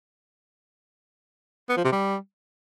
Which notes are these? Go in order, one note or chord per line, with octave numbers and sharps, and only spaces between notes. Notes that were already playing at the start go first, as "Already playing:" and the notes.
B3
F3
C3
G3